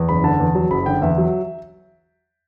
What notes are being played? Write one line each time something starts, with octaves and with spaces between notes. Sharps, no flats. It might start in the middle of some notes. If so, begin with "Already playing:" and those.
Already playing: E2
F#1 B5
D3 A5
E2
F#3
F#1 B5
D3 G5
E2 E5
F#3